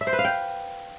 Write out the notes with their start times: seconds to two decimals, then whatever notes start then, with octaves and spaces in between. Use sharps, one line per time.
0.01 E5
0.07 C5
0.13 B4
0.19 F5
0.25 G5